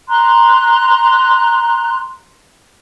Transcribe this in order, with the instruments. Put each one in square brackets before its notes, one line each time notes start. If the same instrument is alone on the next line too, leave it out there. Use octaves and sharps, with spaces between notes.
[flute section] A#5 C6 F#6